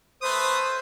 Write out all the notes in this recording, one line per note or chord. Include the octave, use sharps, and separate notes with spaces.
A3 B4 C5 D#6